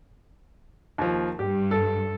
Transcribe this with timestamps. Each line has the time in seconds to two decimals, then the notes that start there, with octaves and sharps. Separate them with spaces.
0.98 D#2 F3
1.39 G2 G4
1.71 A4